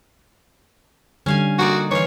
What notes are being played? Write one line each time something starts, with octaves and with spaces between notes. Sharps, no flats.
D3 G3 C#4 F5 G#5
A#3 D#4 F#4 D5
E3 C#5 F5